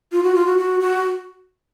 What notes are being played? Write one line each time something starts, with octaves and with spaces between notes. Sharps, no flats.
F4
F#4
F4
F#4
F#4
F#4